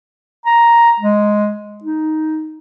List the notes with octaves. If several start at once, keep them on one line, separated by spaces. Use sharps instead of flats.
A#5
G#3
D#4